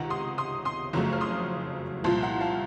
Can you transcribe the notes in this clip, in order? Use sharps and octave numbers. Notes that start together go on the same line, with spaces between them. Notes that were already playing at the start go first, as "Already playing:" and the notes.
Already playing: C#2 C3 D#3 F#5 A#5
C6 D#6
C6 D#6
C6 D#6
F#1 F2 C#3 F#3 A3 A#5 C#6
F6
C6 D#6
C2 A#2 F3 A5 C6
F#5 A#5
F5 A5